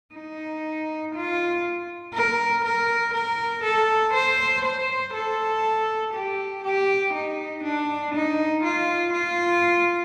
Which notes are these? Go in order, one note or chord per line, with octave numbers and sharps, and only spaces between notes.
D#4
F4
A#4
A#4
A#4
A4
C5
C5
A4
G4
G4
D#4
D4
D#4
F4
F4